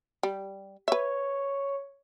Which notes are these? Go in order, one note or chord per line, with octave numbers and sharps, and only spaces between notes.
G3
B4 C#5 E5